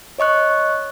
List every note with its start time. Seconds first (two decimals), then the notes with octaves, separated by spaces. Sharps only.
0.18 C#5 D#5 C#6 F#6